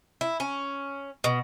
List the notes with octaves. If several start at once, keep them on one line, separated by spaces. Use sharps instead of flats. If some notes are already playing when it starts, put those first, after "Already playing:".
E4
C#4
B2